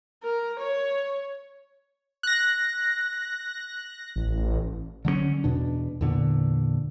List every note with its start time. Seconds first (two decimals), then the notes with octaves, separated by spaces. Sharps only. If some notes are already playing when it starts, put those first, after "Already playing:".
0.23 A#4
0.60 C#5
2.23 F#6 A#6
4.16 A1
5.05 D3 F#3 A3 C#4
5.44 E2 B2 D4
6.01 E2 A#2 D3